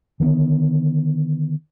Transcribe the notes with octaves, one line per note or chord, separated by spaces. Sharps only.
D3 D#3 G#3 B3